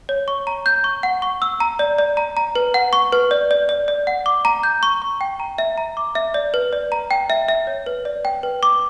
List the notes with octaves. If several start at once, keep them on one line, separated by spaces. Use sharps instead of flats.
C#5
C#6
A#5
G6
C#6
F#5
C#6
E6
A#5
D5
D5
A#5
A#5
B4
F#5
C#6
B4
D5
D5
D5
D5
F#5
D6
A#5
G6
C#6
C#6
G5
A#5
E5
A#5
D6
E5
D5
B4
D5
A#5
G5
E5
E5
C#5
B4
D5
G5
B4
D6